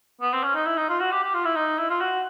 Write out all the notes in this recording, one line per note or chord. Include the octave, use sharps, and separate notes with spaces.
B3
C4
C#4
D#4
E4
D#4
F4
F#4
G4
G4
F4
E4
D#4
E4
F4
F#4